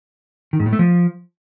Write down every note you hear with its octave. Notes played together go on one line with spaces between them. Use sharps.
D#3
G#2
A2
A3
F3